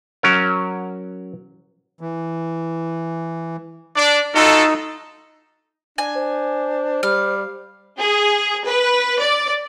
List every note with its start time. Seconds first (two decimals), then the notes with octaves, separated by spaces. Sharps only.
0.23 F#3 C#4 A#4
2.01 E3
3.96 D4 D5
4.35 D#4 F4 F#4 A4 D#5
5.98 D4 G#5
6.15 C5
7.03 G3 F5
7.99 G#4
8.66 B4
9.21 D5